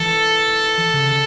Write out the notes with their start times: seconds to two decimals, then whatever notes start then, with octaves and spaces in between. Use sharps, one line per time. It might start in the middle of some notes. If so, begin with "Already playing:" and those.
Already playing: E3 A4
0.94 C#3